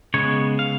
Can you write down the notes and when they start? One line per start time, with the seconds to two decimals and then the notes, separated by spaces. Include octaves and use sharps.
0.14 C#3 G#3 B3 C#5
0.59 F5